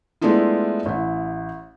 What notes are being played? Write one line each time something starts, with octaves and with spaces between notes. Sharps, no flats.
G#3 A3 B3 D4 E4 F4
A1 E4